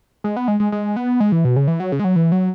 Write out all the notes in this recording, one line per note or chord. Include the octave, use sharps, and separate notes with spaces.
G#3
B3
G#3
G#3
G#3
B3
G#3
E3
B2
C#3
E3
F#3
C#3
G#3
F#3
E3
F#3